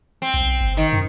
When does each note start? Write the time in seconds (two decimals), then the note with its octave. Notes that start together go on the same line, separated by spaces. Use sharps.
0.22 C4
0.34 B1
0.61 G1
0.77 D#3
0.93 F#2